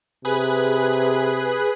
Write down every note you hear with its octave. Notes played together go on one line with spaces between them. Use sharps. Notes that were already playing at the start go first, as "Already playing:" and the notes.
C3 G#4 B4 F#6